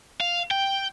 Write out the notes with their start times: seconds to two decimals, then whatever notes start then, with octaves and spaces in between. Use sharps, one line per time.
0.21 F5
0.51 G5